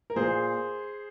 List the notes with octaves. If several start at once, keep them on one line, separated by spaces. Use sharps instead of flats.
A#4
A#2 G#4 C5